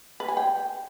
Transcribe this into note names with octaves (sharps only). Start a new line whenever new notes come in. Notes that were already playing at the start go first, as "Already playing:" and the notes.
B4
G#5
G5